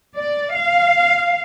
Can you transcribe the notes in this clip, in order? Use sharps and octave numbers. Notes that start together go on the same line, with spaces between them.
D5
F5